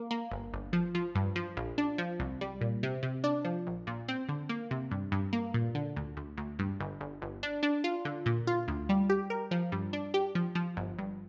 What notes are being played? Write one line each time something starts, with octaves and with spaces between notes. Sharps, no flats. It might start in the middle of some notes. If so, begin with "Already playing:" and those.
Already playing: A#3
A#3
G1
G1
F3
F3
G2
F3
A#1
D4
F3
C2
G3
A#2
C3
C3
D4
F3
A#1
A#2
C4
D3
A#3
C3
G2
G2
A#3
A#2
D3
D2
D2
D2
G2
G1
G1
G1
D4
D4
F4
D3
A#2
F4
D2
G3
G4
A#4
F3
G2
D4
G4
F3
F3
G1
G2